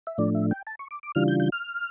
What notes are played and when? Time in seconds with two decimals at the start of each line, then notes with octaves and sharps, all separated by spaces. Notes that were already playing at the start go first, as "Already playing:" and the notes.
0.07 E5
0.18 A2 F3 A3 D4 D5
0.35 E5
0.51 G5
0.67 A5
0.79 C#6
0.91 D6
1.03 D6
1.15 C#3 E3 G3 D4 F4 F6
1.28 G6
1.40 G6
1.52 F6